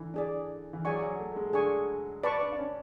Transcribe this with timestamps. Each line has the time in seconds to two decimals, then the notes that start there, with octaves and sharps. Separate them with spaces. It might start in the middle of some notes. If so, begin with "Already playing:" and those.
Already playing: D3 E3
0.14 D4 G#4 D5
0.73 E3
0.85 F#3 G#4 D5 G#5 C#6
1.02 F#3
1.19 A3
1.32 A3
1.36 G#3
1.53 D3 G#4 D5 G#5 C#6
2.23 B4 D5 A5 C#6
2.41 D4
2.52 D4
2.58 C#4